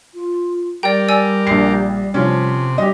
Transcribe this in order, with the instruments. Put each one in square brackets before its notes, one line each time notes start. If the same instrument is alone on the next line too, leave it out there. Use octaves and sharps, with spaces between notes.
[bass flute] F4
[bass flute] G3 [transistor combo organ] G4 A#4 [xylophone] D5 G5
[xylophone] D5 G#5 E6
[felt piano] A#1 C7
[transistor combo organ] C3 [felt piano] F3 C#4
[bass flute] G3 [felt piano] G4 D#5